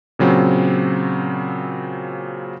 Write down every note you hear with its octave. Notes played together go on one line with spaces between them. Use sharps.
A#2 C#3 F#3 C4